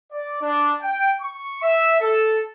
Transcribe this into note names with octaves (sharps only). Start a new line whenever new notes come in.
D5
D4
G5
C#6
E5
A4